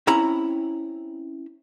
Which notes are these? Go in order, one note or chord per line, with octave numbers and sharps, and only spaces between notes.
C4 C#4 E4 A#5 B5